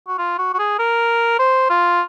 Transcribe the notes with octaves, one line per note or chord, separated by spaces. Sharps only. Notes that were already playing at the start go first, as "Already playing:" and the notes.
F#4
F4
F#4
F#4
G#4
A#4
C5
F4